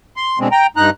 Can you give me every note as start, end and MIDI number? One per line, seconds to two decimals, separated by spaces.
0.17 0.39 84
0.39 0.48 47
0.39 0.48 50
0.39 0.48 56
0.39 0.48 60
0.52 0.67 79
0.52 0.67 82
0.77 0.90 43
0.77 0.90 63
0.77 0.90 82
0.77 0.90 90